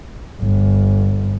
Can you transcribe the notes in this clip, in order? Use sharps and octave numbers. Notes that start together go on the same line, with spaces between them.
G1